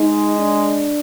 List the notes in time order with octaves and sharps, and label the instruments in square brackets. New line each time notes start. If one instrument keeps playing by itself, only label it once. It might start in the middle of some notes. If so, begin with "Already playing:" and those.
Already playing: [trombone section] G#3 [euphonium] D#4
[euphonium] D4